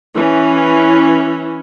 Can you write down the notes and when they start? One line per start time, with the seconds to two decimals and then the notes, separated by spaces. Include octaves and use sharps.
0.17 E3 C#4